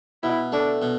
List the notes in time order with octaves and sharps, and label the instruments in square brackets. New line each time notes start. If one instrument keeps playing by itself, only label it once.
[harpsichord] B2 [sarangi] E4
[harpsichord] A3 [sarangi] D4
[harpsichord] B2